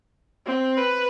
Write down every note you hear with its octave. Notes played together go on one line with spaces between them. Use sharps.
C4
B4